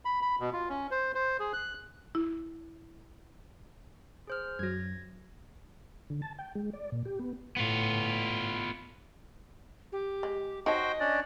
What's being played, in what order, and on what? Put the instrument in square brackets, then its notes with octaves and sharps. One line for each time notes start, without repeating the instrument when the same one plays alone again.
[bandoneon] B5
B5
B2
F4
C#4
C5
C5
G#4
F#6
[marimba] E4
[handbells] G#4 C5 F6
[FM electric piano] F#2 F#3 [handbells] G#6 A#6
[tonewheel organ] D3
A5
G5
G#3
D5
A#2
G4
B3
[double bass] A2 [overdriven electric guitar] B3 F4
[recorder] G4
[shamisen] G#3
[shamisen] D#4 C#5 A5 [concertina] F#4 C5 G5 [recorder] D#5
[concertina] C#4 D4 D5